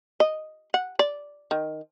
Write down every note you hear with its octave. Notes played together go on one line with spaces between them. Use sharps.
D#5
F#5
D5
D#3